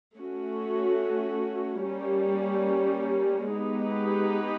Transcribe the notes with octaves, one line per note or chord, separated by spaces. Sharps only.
A3 C#4 F#4
G3 A#3 C#4
G#3 B3 D#4 G4 B4